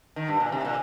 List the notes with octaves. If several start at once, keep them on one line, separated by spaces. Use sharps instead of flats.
D#3
G2
A#2
C3
A#2